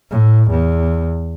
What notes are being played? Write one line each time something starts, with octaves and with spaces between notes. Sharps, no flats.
A2
E2